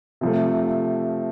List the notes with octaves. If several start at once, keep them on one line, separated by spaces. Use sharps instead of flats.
C3 F3 A3